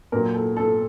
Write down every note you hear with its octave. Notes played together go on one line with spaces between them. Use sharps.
A#2 F#3 A#4
A4
A4